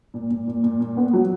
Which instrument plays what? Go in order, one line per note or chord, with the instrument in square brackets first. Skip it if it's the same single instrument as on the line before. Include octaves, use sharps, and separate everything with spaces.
[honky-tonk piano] A#2
A#2
A#2
A#2
A#2
B3
F#3